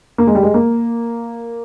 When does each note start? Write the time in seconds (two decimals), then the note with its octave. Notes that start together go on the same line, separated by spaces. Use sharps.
0.18 A#3
0.27 G#3
0.35 G3
0.43 G#3
0.54 A#3